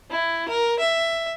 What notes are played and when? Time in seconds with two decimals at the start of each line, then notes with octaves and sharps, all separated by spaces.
0.10 E4
0.48 A#4
0.79 E5